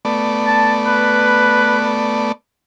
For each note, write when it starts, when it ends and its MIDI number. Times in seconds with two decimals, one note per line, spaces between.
0.05 2.32 57
0.05 2.32 59
0.05 2.32 74
0.47 0.72 81
0.87 1.96 71